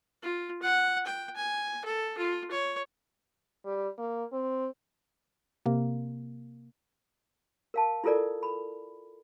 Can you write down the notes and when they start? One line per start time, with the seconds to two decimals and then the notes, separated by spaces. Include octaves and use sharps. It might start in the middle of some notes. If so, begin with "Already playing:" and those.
0.22 F4
0.62 F#5
1.06 G5
1.36 G#5
1.85 A4
2.17 F4
2.51 C#5
3.65 G3
3.98 A#3
4.32 C4
5.66 C3 A#3
7.74 A#4 F5 A5
8.04 E4 F4 A4 A#4 D5
8.43 B5